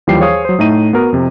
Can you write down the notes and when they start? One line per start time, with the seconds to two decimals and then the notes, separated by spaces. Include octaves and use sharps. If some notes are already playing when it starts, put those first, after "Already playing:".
0.07 D#2 E3 F3 G3 G4 C7
0.20 G#4 C5 C#5 F5 D#6
0.45 F#3 C5
0.59 A2 A3 D#4 D#7
0.93 B3 F#4 A#4
1.13 F2 C3